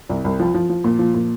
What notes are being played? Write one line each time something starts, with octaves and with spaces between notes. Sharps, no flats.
C2
C2
F3
F3
F3
A#2
F3
A#2